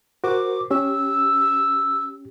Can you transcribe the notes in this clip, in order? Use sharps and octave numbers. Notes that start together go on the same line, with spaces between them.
F#4 A#4 C5 D6
C#4 G4 E6